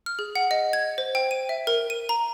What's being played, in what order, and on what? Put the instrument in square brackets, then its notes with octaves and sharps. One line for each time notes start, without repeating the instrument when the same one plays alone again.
[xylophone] F6
G#4
F#5
D#5
G#6
C5
G5
D#7
E5
A#4
D#7
A#5